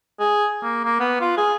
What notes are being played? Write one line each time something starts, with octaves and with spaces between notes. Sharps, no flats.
G#4
A#3
A#3
B3
F4
G#4